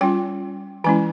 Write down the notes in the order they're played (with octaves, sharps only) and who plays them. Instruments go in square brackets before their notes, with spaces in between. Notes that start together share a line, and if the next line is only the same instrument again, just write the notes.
[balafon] G3 C#4 F4 G5
E3 G#3 C#4 E4 G#5